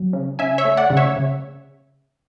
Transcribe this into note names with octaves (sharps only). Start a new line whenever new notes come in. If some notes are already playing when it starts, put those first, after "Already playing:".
Already playing: F#3
C#3
C#3 E5 G#5
C#5 E5
A3
D5 F#5
C#3
C#5 E5
C#3